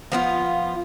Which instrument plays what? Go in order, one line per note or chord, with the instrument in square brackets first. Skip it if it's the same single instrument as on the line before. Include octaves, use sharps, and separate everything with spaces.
[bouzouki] F3 B3 F4